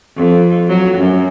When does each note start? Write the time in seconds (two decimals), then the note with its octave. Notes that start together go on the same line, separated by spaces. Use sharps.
0.17 F2
0.69 F#3
0.98 F#2